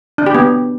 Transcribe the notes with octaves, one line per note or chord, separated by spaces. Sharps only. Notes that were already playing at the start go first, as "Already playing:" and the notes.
D4
G4
B3